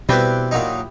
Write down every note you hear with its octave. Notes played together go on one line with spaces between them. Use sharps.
B2 G3 C4 E4 G4 B4
A#2 F#3 D#4